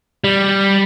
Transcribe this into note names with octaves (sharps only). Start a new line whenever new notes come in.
G3